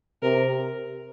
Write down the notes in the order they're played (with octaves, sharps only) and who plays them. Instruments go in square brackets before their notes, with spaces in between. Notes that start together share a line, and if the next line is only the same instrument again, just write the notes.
[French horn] C3 [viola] A#4